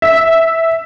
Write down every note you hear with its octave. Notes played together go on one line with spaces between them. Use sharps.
E5